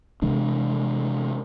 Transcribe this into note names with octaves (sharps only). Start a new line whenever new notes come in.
C3 E3 G#3 D4